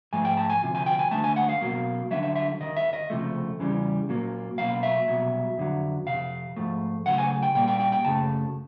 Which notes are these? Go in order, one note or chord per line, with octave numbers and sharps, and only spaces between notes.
G#2 F3 A3 G#5
G5
A5
G#5
D2 C3 F3
G#5
G5
G#5
D#2 D3 F#3 A3 A5
G#5
F#5
F5
B1 B2 F#3 A#3
D#2 D3 F#3 E5
E5
E5
D#2 D#3 D#5
E5
D#5
C#2 C3 F3 A3
E2 C#3 E3 G3
A#2 F#3 A#3
B1 B2 F#3 A#3 F5
E5
C2 B2 F#3
F2 D3 F#3
F2 C3 F5
G#2 F3 A3
D#2 C#3 F#3 A3 F#5
G#5
G5
A#2 G3 A#3 G5
G5
G5
G5
F#2 C#3 A3 A5